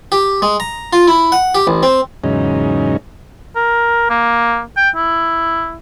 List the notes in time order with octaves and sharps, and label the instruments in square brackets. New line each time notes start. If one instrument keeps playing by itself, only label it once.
[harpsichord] G4
G#3
A#5
F4
E4
F#5
G4
A1
C4
[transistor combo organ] E2 G#2 C#3 F#3 C#4 D#4
[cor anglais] A#4
A#3
G5
E4